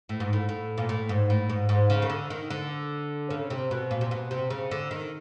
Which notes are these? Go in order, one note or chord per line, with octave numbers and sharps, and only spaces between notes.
A2
G#2
A2
A2
A#2
A2
G#2
A2
G#2
G#2
C#3
D#3
D3
D#3
D3
C#3
C3
B2
A#2
C3
B2
C3
C#3
D3
D#3